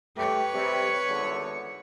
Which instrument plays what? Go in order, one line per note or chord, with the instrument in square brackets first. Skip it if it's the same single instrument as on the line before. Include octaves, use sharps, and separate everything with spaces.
[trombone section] A3 G4 [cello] B4 C#5
[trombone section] C3 G3
G#1 E2 D3